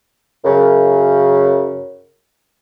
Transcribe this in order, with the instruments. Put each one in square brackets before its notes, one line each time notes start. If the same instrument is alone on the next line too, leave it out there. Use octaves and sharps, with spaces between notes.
[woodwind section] F#2 C#3